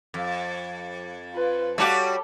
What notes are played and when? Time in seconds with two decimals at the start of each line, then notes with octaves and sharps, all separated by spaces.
0.14 F2
1.34 F4 B4
1.78 G3 F#4 A4 C#5 A5 D6